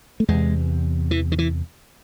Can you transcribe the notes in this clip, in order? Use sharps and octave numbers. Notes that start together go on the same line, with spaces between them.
A3
E2 C3 G#3
E3
D#3
E3